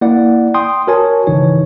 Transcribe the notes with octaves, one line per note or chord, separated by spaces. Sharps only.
A#3 E4 D5 F#5
G5 C6 D#6
F#4 A#4 C#5 G#5 A5
G#1 C#3 E3 D#4 C#5